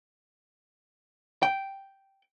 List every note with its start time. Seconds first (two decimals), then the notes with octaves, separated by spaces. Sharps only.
1.43 G5